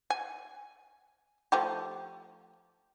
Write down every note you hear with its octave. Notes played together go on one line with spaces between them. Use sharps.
G#5
F3 A3 G4